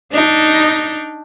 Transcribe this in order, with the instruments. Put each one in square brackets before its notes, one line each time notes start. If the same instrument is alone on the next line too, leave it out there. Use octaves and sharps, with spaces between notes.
[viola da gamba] D4 D#4